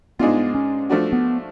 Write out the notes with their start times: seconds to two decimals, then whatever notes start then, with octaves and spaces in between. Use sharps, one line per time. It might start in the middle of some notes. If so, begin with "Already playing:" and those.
0.19 G#2 G#3 B3 D4 F4
0.55 C#4
0.89 F3 A3 D4 F#4
1.13 B3